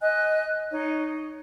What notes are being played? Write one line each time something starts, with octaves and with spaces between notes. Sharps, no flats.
D#5 G#5 F#6
D#4 C#5